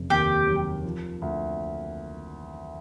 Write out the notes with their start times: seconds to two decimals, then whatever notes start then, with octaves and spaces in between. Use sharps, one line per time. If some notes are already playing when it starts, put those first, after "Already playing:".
Already playing: F1 C#3
0.10 D#2 G4
0.47 F#3
0.85 F3
1.22 D2